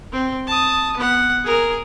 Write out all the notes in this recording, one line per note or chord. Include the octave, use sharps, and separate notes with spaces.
C4
A5 D#6
B3 F#5
G#4 A#4